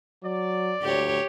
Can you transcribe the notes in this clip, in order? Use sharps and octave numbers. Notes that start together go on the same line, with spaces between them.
F#3 D5
D2 G4 C#5